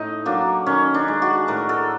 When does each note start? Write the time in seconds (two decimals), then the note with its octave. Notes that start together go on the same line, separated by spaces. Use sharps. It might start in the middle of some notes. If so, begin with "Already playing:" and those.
Already playing: A2 D#4
0.26 F#3 A#3 D4
0.66 D#3 C#4
0.94 D4
1.08 G#3
1.22 F#4
1.48 A2 A#4
1.69 A4